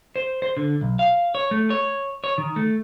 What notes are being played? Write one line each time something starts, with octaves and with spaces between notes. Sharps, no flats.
C5
C5
D3
B1
F5
C#5
A3
C#5
C#5
D#3
A3